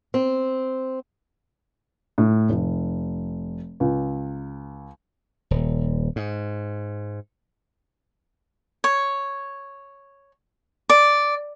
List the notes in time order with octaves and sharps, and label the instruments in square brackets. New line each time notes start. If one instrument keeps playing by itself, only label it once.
[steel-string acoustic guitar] C4
[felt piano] A2
F1
C#2
[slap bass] D#1
G#2
[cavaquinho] C#5
D5